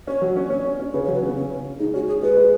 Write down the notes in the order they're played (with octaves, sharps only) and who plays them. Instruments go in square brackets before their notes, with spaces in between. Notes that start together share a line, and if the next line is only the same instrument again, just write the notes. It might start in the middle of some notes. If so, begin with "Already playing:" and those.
[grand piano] C#4 [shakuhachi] C#5
[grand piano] F#3
C#4
[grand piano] C#4 [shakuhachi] C#5
[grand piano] C#4
C#4
[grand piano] C#3 [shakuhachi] B4
[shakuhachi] C#5
[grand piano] F#3
[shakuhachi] B4
[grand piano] C#3 [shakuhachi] B3
[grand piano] C#3 [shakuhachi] C#4
[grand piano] C#4
C#3
[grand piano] G#3 [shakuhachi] D#4
[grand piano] C#4 [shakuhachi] F#4
[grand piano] G#3 [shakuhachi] G#4
[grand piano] G#3 [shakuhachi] B4
[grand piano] G#3